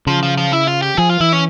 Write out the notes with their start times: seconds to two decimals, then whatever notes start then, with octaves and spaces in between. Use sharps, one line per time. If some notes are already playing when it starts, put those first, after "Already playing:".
0.07 C#3 F3
0.23 F3
0.37 F3
0.53 E4
0.67 F4
0.82 G4
0.97 F3 G#4
1.09 F4
1.20 E3 E4
1.33 C#4